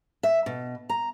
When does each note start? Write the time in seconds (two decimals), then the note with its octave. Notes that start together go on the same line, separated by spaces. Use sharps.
0.23 E5
0.46 B2
0.89 A#5